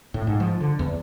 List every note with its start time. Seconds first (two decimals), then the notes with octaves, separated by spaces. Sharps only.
0.14 A2
0.27 G#2
0.40 F3
0.60 D3
0.79 E2